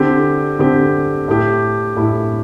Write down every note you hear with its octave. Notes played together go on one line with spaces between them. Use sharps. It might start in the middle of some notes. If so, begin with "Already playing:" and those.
Already playing: D3 C4 G4
D3 C4 G4
A2 A3 E4 G4
A2 A3 E4 G4